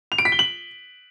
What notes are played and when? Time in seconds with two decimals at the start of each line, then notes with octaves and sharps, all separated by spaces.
0.12 F7
0.18 D7
0.25 B6
0.32 G7
0.39 F#7